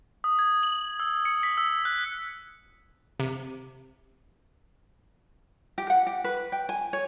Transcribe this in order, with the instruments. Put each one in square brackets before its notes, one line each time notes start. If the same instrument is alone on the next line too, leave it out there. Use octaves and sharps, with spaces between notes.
[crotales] D#6
G#6
F#7
E6
C#7
B6
E6
F#6
[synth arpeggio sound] C3
[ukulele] G4
F#5
G4
B4
G5
G#5
C#5